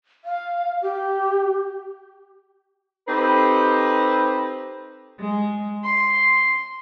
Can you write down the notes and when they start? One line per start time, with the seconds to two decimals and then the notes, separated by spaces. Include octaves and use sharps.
0.25 F5
0.82 G4
3.08 C4 D#4 G4 A4 B4 C5
5.21 G#3
5.84 C6